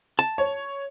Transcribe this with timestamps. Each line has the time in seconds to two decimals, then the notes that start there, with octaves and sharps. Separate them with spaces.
0.19 A5
0.38 C#5